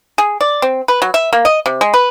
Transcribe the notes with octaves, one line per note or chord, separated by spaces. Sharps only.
G#4
D5
C4
B4
F#3
E5
A#3
D#5
C3
G#3
B4